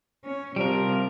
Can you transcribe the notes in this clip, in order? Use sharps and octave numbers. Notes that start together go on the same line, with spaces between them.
C#4
C3 F3 G3 G4 A#4 D7